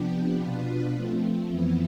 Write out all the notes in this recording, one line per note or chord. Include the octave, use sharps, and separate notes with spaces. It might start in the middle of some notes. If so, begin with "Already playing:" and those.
Already playing: C3 F3 B3 D4 G4
B2 B3 D4 F4 B4
F3 A3 C4
F2 E3 B3 E4